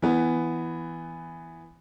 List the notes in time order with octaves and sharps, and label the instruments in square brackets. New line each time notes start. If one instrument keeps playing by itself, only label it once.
[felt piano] E3 B3